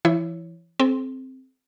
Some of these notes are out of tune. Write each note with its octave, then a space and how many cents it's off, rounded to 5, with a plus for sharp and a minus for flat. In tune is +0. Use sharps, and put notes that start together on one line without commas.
E3 +40 E4 +0 C#5 +0
C4 +0 A4 -45